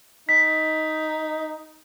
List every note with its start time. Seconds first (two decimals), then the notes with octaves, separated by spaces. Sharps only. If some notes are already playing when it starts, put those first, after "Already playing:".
0.29 D#4 B6